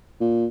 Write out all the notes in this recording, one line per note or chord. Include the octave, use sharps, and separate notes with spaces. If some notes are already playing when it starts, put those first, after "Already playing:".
A#2